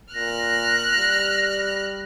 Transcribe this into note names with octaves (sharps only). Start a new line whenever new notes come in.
A#2 F6 F#6 A#6
G3